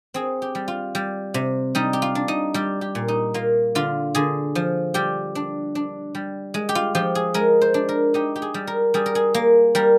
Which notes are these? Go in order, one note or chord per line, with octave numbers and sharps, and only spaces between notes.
C4 G#4
G4
G3
F4
G3
C3
G3 D#4
G4
F4
D4
D#4
G3 G4
G4
A#2
D#4
A#3 F4
D3 F4
D3 G#4
F3
G3 G4
D4
D4
G3
G#3
G4
F4
F3 G4
G#4
G#3 A#4
C5
D4
A#4
D#4 G4
G4
G#4
G3
A#4
G3 G#4
A#4
G#4
A#3
G3 A#4